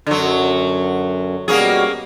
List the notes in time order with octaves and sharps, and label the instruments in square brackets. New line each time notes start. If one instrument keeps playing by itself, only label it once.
[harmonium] F#2 [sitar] D3 F#3
[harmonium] B2 G3 F#4 [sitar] A#3 C#4 G#4